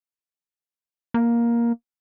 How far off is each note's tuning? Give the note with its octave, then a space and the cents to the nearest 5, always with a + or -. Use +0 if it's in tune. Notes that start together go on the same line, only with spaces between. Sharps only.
A#3 +10